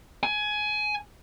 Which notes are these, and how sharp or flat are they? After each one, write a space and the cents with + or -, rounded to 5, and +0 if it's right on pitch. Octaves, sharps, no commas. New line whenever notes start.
G#5 +20